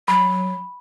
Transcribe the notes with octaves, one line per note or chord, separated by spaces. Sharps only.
F#3 B5